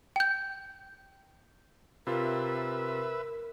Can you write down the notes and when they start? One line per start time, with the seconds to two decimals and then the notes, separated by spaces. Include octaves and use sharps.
0.16 G5 G6
2.07 C3 F4 A#4 B4 E5